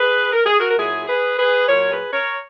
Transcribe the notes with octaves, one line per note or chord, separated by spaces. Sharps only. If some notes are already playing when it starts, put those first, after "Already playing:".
Already playing: G#4 B4
A#4
G#4
F#4 A#4
A#4
A#2 F#3 E4 G#4
G#4 B4
G#4 B4
A#2 F#3 A#4 C#5
G#4 B4
A#4 C#5